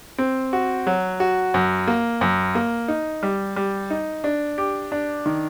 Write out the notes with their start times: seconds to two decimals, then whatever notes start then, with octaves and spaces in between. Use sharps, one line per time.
0.18 C4
0.53 F#4
0.87 F#3
1.20 F#4
1.54 F#2
1.87 A#3
2.21 F#2
2.55 A#3
2.88 D#4
3.23 G3
3.56 G3
3.90 D#4
4.24 D4
4.58 G4
4.92 D4
5.26 D#3